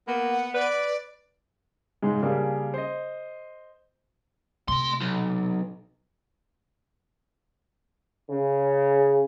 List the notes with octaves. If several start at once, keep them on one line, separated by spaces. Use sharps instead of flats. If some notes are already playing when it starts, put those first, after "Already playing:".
A#3 B3
F#5
B4 D5
G#2 C#3 G#3
C#3 G3 A#3 D4 G#4
C5 D#5
C3 A3 C6
B1
C#3